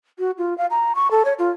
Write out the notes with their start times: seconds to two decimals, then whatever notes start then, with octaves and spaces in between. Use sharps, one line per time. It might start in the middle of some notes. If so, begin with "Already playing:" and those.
0.19 F#4
0.38 F4
0.58 F5
0.70 A#5
0.95 C#6
1.11 A4
1.25 C#5
1.39 F4